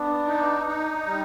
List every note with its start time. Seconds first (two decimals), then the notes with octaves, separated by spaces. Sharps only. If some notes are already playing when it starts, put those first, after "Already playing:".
Already playing: B3 D4
0.26 D#4
0.67 D#4
1.06 G3